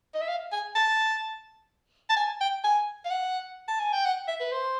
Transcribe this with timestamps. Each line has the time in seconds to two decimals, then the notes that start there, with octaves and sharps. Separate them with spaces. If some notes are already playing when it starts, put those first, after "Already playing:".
0.15 D#5
0.21 E5
0.28 F5
0.52 G#5
0.75 A5
2.10 A5
2.16 G#5
2.41 G5
2.64 G#5
3.05 F5
3.11 F#5
3.68 A5
3.80 G#5
3.92 G5
4.05 F#5
4.28 E5
4.41 B4
4.52 C5